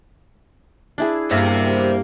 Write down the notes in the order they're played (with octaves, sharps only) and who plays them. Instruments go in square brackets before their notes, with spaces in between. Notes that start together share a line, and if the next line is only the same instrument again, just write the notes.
[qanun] D4 E4 G#4
[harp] G2 [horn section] G3 A#3 [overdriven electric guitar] C5 E5